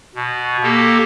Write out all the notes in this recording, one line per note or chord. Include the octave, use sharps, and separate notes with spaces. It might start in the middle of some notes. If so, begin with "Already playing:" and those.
B2
A#3 G4 A4